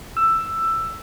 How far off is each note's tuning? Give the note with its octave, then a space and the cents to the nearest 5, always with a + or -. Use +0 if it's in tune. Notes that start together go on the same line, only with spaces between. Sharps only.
E6 +10